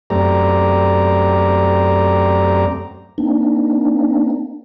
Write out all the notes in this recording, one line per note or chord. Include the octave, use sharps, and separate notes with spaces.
F#2 A3 C4 G4 D5 A#5
A#3 C4 D4 D#4